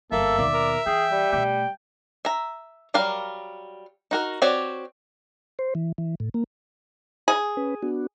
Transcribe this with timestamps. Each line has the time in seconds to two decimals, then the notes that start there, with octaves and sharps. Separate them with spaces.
0.12 G1 F#2 A#3 A4 E5
0.39 D#2 B2 D5
0.53 A#4
0.86 E3 G#4 G5
1.11 G3
1.32 B2 A3 G5
2.25 E5 A#5
2.94 F#3 G3 A#4 F5
4.11 D#4 F#4 A#4
4.42 C4 F#4 G4 C#5 D5
5.59 C5
5.75 E3
5.98 E3
6.20 A2
6.34 A#3
7.28 G#4
7.57 C#4 B4
7.83 B3 D4 F#4